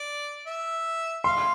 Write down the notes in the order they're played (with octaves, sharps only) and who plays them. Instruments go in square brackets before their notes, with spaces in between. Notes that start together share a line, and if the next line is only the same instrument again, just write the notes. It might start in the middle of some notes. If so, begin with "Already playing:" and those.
Already playing: [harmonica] D5
E5
[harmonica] F5 [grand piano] C6